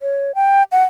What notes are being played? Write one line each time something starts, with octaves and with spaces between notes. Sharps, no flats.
C#5
G5
F#5